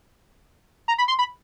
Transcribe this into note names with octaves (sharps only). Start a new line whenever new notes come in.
A#5
B5
C6
B5